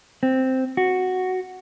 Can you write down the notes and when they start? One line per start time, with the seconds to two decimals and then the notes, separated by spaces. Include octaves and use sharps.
0.23 C4
0.77 F#4